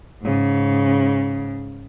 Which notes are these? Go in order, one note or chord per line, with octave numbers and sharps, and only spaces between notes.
G#2 C#3